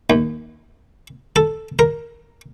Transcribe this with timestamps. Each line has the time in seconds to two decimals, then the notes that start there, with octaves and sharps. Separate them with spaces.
0.10 D#2
1.36 A4
1.79 A#4